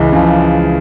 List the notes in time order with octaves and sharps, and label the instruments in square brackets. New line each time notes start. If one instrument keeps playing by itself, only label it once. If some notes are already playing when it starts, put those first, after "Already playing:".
Already playing: [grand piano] C#2 [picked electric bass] E3
[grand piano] C#3 F3